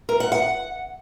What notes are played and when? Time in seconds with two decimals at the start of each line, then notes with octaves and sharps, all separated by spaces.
0.09 A#4
0.20 F#5
0.32 F#5